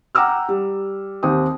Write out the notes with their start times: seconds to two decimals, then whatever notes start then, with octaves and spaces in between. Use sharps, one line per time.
0.15 F#5 G5 A#5 D6 E6 F6
0.49 G3
1.23 D#2 C4 G4 D#6